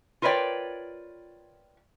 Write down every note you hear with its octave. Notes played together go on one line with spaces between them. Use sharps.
F4 A#4 B4 C#5 D5 G5